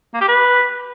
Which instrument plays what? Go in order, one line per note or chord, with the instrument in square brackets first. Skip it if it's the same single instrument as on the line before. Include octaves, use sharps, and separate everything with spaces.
[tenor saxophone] A#3
G4
B4